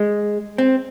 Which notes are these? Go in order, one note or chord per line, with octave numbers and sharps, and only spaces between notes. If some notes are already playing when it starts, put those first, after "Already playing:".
Already playing: G#3
C4